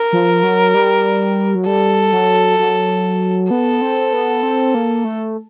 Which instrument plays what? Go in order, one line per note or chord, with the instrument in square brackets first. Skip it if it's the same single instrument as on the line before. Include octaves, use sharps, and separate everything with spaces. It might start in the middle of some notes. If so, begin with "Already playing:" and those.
Already playing: [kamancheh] A#4
[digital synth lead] F3
F#3
G3
F#3
[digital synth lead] G3 [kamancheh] A4
[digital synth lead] F#3
F#3
[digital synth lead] B3 [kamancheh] A4
[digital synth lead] C4
B3
C4
A#3
A3